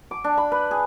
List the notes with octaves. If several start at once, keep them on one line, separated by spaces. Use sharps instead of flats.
D6
D4
B5
B4
G#4